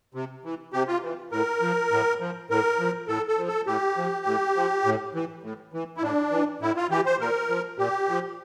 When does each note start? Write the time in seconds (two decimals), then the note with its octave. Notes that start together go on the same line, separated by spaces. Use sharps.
0.14 C3
0.44 E3
0.73 C3 G4
0.88 F4
1.03 E3
1.32 A2 A#4
1.62 F3
1.91 A2
2.21 F3
2.50 A2 A#4
2.79 F3
3.08 A2 A4
3.28 A4
3.38 F3
3.48 A4
3.67 A2 G4
3.97 F3
4.26 A2
4.56 F3
4.85 A2
5.15 E3
5.43 A2
5.74 E3
5.97 E4
6.02 A2 D4
6.32 E3
6.61 A2 E4
6.77 F4
6.90 E3 G4
7.06 C5
7.20 A#2 A#4
7.49 F3
7.78 A#2 G4
8.09 F3